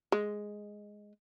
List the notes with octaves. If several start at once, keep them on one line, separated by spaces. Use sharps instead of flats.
G#3